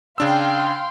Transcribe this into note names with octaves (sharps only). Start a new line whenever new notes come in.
C#3 D4 F5 G5 C6 E6